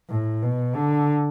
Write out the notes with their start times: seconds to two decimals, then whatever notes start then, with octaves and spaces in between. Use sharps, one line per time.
0.09 A2
0.42 B2
0.76 D3